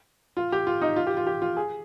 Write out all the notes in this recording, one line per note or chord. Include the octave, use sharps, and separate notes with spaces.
F4
G4
F4
D#4
F4
G4
F4
G4
F4
G#4